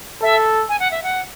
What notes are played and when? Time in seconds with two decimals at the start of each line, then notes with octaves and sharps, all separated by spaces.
0.22 A4 E5
0.69 G#5
0.79 F#5
0.91 E5
1.03 F#5